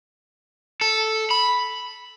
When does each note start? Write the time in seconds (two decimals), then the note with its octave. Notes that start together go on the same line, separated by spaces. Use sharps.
0.81 A4
1.31 B5